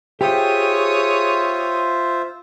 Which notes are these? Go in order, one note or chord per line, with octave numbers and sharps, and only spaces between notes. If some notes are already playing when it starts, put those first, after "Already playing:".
F4 G4 G#4 C5 C#5 E5 D#6